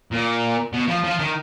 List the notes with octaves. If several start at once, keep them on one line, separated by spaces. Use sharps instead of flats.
A#2
B2
F3
F3
D#3